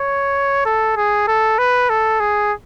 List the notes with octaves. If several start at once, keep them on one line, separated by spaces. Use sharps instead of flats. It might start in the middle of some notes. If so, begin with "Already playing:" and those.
Already playing: C#5
A4
G#4
A4
B4
A4
G#4